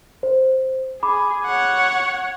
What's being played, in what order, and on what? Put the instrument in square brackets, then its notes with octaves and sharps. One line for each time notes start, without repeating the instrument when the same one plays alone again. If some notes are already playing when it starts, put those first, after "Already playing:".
[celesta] C5
[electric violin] G#4 [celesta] B5 D6
[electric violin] C#5 F#5